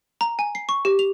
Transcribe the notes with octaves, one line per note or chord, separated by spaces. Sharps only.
A#5
G#5
C7
C#6
G4
F7